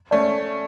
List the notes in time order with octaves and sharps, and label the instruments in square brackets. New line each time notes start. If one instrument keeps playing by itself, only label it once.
[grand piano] A3 C#4 [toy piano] D5 A5